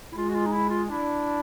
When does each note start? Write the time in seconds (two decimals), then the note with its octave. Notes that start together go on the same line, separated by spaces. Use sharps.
0.12 E4
0.17 G#3 F4
0.30 F#4
0.35 F4
0.46 D#4
0.52 E4
0.70 F4
0.88 D4 E4